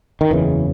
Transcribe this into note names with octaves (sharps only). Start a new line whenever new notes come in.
D#3
F#1 E2 C#3 E3